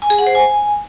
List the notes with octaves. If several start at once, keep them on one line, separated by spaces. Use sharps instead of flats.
G#5
G#4
F#5
C5
G#5